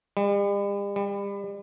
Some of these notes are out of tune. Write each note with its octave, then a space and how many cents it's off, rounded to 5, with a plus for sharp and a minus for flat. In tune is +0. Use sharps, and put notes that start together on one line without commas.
G3 +45
G3 +35